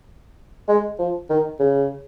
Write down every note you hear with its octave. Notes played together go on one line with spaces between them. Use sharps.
G#3
F3
D#3
C#3